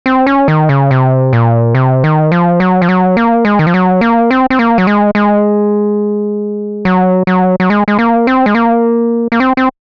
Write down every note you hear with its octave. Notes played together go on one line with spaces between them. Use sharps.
C4
C#4
D#3
C#3
C3
A#2
C3
D#3
F3
F#3
F3
F#3
A#3
G#3
D#3
F3
F#3
A#3
C4
C4
A#3
F#3
G#3
G#3
F#3
F#3
F#3
G#3
G#3
A#3
C4
G#3
A#3
A#3
C4
C4